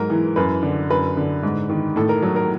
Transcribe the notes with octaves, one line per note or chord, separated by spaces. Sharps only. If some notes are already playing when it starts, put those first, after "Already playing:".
Already playing: G#2 F#3 A#4
E3
F#2 B4
D3
F#2 B4
D3
G#2
D#3
A2 A4
A#4
F#3 A4
A#4